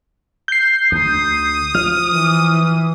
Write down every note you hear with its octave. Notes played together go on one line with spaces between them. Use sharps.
G6 C7
D2 D#6
F3 F6
E3